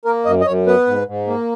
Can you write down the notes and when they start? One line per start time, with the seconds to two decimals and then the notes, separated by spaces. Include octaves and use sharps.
0.05 A#3 A#4
0.25 F#2 D#5
0.41 D#5
0.46 F#2 C#5
0.66 B3 B4
0.87 G#2
1.07 G#2
1.27 A#3